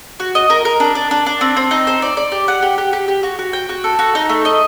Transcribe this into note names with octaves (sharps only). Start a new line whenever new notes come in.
F#4
D#5
A#4
A#4
D4
D4
D4
D4
C4
C4
D#4
C5
D5
D5
G4
F#5
G4
G4
G4
G4
F#4
F#4
G5
F#4
A4
F#4
D#4
A3
D#5